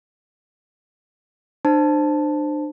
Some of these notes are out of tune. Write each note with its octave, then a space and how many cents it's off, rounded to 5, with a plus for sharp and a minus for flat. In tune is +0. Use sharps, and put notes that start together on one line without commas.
D4 +35 C5 +0 A5 +0